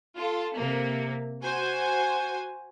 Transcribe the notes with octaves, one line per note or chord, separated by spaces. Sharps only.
F4 A4
C3 A#3
F#4 C5 G#5